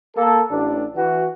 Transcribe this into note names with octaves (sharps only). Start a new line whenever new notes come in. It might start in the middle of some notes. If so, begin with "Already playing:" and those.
A#3 A4
A1 D4
E3 F#4